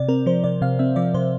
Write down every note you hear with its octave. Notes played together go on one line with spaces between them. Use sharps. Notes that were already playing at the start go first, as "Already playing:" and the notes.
Already playing: C3 D5
C4 A#4
F3 C5
C3 D5
C3 F5
C4 E5
F3 D5
C3 C5